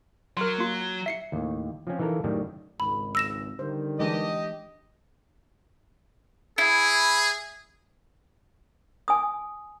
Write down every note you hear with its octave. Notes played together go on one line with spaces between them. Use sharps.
F#3 A#4 C6
A#3 F4
E5 C7 C#7
D#2 A2
F3 C4 C#4
E3 D#4 F4 A4 A#4
F#2 A2 D#3 G3
G#1 C#2 G#2 B5
E6 A#6 E7
D3 D#3 G3 C5
E3 G#3 D4 G4 D#5
E4 G#4
G#5 D#6